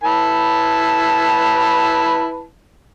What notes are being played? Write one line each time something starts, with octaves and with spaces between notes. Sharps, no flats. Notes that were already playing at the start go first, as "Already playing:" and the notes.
E4 B4 A5